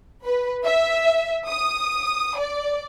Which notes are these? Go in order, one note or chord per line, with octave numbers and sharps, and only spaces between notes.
B4
E5
D#6
D5